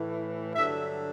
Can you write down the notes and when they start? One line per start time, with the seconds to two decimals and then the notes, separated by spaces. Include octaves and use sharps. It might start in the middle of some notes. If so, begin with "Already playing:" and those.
Already playing: A2 E3
0.55 G2 D3 F#3 E5